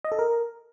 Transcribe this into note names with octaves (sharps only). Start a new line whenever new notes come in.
D#5
A4
A#4